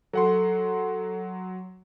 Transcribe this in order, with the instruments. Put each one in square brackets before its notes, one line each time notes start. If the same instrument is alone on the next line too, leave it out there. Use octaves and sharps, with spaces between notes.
[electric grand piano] F#3 F#5 C6 [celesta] A4